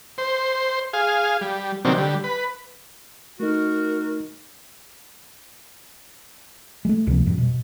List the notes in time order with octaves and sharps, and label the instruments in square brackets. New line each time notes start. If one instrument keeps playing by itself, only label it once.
[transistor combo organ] C5
G#4 F5
G3
C3 D#3 F#3 A#3 C4 D4
D3 G3
B4
[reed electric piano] A3 D#4 [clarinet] F#4 [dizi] A#4
[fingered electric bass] G#3 A3
C#2 C3 F3 A#3
F2 G#2 G3
B2